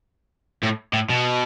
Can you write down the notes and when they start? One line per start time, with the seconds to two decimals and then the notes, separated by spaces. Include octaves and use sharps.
0.63 A2
0.93 A2
1.09 B2